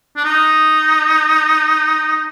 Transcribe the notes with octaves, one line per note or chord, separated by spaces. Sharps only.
D4
D#4